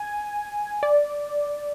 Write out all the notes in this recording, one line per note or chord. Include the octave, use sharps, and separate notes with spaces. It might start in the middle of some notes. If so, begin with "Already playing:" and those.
Already playing: G#5
D5